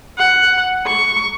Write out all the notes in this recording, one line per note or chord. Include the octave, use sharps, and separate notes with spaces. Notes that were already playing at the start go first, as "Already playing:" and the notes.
F#5
C#6